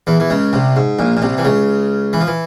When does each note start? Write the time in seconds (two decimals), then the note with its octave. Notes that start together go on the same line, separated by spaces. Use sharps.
0.07 E2 E3
0.20 E3
0.30 C#2 C#3
0.53 C2 C3
0.76 G#2
0.99 A#1 A#2
1.17 A#2
1.22 C2 C3
1.38 E3
1.44 C#2 C#3
2.13 E3
2.21 F3
2.27 E3